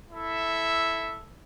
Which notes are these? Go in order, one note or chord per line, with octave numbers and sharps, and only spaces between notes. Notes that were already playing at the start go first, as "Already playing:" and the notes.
E4 A4 E5